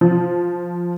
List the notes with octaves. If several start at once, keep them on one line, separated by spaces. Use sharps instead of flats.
F3